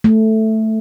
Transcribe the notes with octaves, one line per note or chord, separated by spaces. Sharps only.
A3